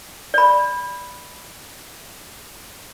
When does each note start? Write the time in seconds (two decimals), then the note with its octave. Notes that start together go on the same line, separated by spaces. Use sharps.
0.34 D5 B5